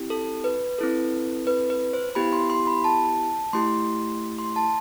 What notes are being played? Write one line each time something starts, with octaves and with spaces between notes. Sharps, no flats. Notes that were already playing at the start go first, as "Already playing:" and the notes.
Already playing: C4 E4 G4
A4
B4
C4 E4 A4
B4
B4
C5
B3 E4 G4 B5
C6
C6
B5
A5
A3 E4 G4 C6
C6
A5